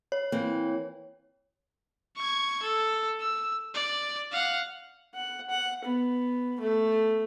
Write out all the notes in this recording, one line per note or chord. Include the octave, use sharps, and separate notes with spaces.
C#5
E3 A#3 C4
C#6 G#6
A4
E6
D5
F5 F#5
F#5
F#5
B3
A3